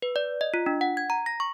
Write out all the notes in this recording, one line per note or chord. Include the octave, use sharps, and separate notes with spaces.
B4
D5
D#5
F4
D4
F#5
G#6
A#5
A#6
C#6